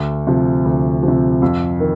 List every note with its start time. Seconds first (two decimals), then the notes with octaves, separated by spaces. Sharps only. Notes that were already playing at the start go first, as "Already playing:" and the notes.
Already playing: D2
0.27 C3 F3
0.65 D2
1.03 C3 F3
1.42 F2
1.80 D#3